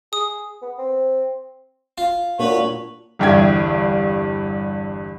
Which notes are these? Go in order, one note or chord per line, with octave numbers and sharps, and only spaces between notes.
G#4 D#6
B3
C4
F4
A#2 A#3 D4 F#4 B4 C#5
G1 E2 G2 E5 G5 G#6